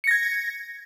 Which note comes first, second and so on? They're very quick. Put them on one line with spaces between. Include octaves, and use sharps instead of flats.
C#7 A#6 G#6